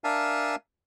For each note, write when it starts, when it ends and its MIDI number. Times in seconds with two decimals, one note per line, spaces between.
0.04 0.56 62
0.04 0.56 70
0.04 0.56 76
0.04 0.56 77
0.04 0.56 80
0.04 0.56 81